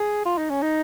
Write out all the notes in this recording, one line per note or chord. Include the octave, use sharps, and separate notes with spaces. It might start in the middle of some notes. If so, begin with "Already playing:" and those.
Already playing: G#4
F4
D#4
C#4
D#4